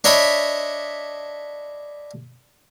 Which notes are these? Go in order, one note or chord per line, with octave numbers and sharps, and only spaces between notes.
D4 C#5 D#5 E5 B5